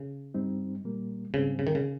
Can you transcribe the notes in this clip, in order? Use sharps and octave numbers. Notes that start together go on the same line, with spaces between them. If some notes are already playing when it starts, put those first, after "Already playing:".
Already playing: C#3
G2 G3 C4 D#4
A#2 G3 A#3
G#2 C#3 G3 C4
C#3
D#3
C#3